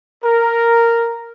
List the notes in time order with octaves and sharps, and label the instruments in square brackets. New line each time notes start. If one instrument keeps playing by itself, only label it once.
[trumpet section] A#4